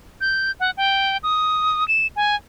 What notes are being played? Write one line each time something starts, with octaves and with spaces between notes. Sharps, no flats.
G6
F#5
G5
D#6
E7
G#5